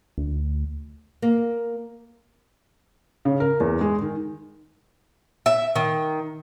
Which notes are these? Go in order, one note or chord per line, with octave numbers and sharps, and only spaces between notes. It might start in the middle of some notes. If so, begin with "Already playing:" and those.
D2
A#3
C#3
A#4
E2
G#3
D#3
E5
D#3